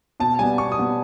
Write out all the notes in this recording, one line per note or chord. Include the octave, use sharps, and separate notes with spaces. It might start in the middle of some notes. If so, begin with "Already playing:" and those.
B2 A5
G3 B3 G#5
B2 C#6
D#6
G3 B3